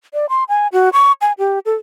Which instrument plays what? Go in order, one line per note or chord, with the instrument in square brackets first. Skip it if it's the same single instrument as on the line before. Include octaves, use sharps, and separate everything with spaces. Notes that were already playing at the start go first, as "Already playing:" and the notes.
[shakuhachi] D5
C6
G#5
F#4
C#6
G#5
G4
A4